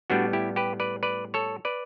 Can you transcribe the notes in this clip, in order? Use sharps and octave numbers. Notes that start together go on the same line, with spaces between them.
A2 G3 B3 D4 F#4
E4 G4
G4 B4
B4 D5
B4 D5
A4 C#5
B4 D5